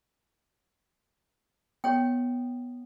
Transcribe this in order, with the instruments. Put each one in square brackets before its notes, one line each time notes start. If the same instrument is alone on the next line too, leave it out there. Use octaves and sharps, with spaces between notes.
[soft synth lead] B3 [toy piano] G4 C#5 G5